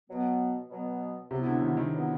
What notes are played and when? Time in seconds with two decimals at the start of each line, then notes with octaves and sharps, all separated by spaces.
0.08 B2 F#3 B3
0.69 B2 F#3 B3
1.31 C3 F#3 B3 E4
1.46 D3
1.62 D#3
1.77 D#3
1.93 F#3 B3 E4